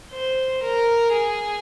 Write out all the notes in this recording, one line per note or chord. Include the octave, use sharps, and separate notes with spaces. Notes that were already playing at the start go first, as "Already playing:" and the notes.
C5
A#4
G#4